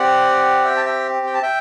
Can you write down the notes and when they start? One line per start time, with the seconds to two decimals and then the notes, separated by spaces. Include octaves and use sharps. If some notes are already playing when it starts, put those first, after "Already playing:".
Already playing: C4 G4 D5 F#5
0.65 E5 G5
0.77 A5
0.85 E5 G5
1.26 G5
1.34 A5
1.42 E5 G5